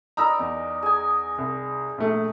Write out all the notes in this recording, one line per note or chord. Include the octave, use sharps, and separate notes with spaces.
D#4 A#4 D5 A#5 B5 E6
E2
G#4 G#5
C2
A#1 A3